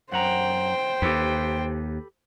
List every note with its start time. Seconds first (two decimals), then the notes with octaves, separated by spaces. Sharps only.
0.12 F#2 C5 F#5 G5 A#5
1.02 D#2 G4 A4 B4